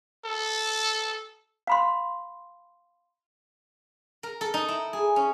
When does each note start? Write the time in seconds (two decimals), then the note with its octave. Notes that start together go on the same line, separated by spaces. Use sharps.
0.25 A4
1.67 F5 B5 C6
4.23 A#4
4.41 A4
4.54 D#4
4.68 E4
4.93 G#4
5.16 C#4